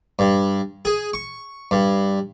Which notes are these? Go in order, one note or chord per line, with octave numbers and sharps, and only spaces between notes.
G2
G#4
C#6
G2